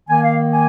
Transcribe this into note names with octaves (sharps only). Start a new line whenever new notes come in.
D#3 A#3 G#5
F5
G#5